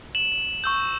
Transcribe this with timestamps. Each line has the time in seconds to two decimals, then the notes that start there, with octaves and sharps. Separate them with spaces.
0.15 E7 F#7
0.64 C#6 E6 G6